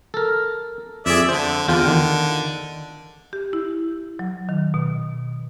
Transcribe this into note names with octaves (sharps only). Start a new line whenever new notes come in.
A4 A#4
F2 G#4 D5 E5
D3 C5
E2 D3 F4 G5
D#3
G4
E4
F#3
D#3
B2